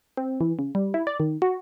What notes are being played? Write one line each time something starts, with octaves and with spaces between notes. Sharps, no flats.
C4
E3
C#3
G3
E4
D5
D#3
F#4